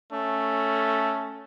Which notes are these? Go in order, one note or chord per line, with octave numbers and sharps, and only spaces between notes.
A3 C#4